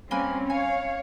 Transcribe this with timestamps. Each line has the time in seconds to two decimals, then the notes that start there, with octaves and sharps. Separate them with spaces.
0.11 G3 A#3 C4 C#4 B4 G#5
0.50 C#5 F5 G#5